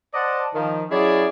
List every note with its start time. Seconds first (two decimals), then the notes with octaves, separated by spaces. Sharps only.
0.14 C5 D5 D#5 F#5 A5
0.55 D#3 F3
0.90 F#3 C#4 E4 G#4 D5 D#5